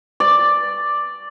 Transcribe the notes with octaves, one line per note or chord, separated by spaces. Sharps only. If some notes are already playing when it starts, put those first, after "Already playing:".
D5